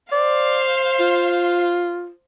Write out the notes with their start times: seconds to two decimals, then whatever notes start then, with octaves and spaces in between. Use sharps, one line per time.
0.12 C5 D5 F5
1.00 F4